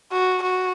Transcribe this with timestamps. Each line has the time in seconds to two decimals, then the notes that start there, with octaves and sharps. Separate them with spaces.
0.12 F#4
0.43 F#4